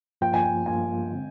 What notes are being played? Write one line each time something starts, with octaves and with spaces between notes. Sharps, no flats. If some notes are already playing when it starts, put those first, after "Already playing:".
G2 F3 A#3 F4 G5
G#5
G5
G2 F3 A#3 F4 G#5
D3 G#3 C4